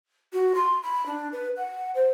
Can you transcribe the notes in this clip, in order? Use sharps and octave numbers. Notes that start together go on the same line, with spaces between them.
F#4
C6
B5
D4
B4
F#5
C5